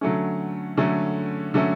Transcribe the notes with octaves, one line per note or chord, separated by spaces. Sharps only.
D3 F#3 A3 C#4
D3 F#3 A3 C#4
D3 F#3 A3 C#4